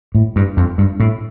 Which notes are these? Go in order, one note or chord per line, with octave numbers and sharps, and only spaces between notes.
A2
G2
F2
G2
A2